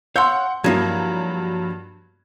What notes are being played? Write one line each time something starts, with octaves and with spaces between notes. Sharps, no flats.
C#5 F5 F#5 C6 E6 G6
G2 F3 F#3 A#3 E4 G#6